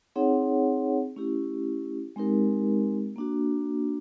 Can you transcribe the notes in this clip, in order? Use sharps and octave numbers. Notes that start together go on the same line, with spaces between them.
C4 D#4 G#4 C#5 F#5
A3 C#4 E4 G4
G#3 C4 D#4 G4 A#4
A#3 D4 F#4